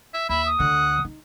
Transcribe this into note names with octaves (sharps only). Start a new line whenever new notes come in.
E5
D#2 E5 B5
D#6
D2 D3 F#5
D#4